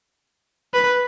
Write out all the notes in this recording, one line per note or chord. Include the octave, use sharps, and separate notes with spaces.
B4